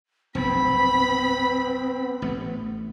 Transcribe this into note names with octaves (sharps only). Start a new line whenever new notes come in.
F1 B1 G2 B3 C4 B5
A1 A3